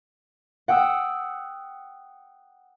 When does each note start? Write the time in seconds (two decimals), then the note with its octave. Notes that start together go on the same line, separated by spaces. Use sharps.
0.68 F#5 G5 D#6 E6